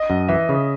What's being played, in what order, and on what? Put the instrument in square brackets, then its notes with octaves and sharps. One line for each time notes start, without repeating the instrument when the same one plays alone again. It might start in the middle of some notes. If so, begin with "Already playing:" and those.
Already playing: [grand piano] D#5
[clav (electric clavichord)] F#2
[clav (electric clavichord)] E3 [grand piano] E5
[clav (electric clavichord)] C#3